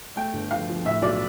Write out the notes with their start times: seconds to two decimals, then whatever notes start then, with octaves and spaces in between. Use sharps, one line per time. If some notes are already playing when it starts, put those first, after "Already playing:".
0.16 A3 G5
0.33 G1
0.51 F3 F5
0.69 F3
0.85 A2 E5
1.02 B1 D5